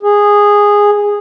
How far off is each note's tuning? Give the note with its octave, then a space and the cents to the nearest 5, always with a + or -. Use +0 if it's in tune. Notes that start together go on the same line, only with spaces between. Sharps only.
G#4 -10